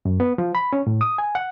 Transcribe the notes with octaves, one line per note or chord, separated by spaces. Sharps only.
F#2
B3
F3
B5
C#4
A2
D#6
G#5
F#5